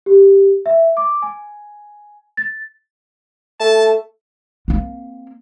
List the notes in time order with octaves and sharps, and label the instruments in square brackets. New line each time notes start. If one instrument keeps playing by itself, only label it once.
[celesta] G4
E5
D6
G#5
A6
[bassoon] A3 [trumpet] A5
[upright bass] A#3 C4